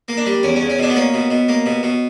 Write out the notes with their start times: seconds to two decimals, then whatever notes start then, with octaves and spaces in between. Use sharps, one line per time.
0.08 A#3
0.17 D4
0.26 G3
0.43 E2 C#4
0.56 C#4
0.61 E2
0.70 C#4
0.79 B2 D4
0.90 B3
0.96 A#3 C#4
1.14 B2
1.30 B2
1.49 A#3
1.66 B2
1.83 B2